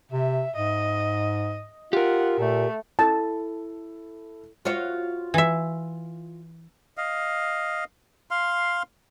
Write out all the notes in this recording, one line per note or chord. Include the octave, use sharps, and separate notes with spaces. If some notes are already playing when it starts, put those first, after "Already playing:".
C3 E5
G#2 D#5
F4 G4 A#4 F#5
A#2 A3
E4 A4 A5
F4 F#4 C#5
E3 E5
D#5 F5
F5 C6